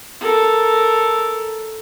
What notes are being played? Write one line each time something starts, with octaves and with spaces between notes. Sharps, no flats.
A4 A#4